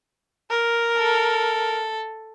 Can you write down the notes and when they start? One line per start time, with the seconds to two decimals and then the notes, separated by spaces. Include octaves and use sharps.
0.50 A#4
0.98 A4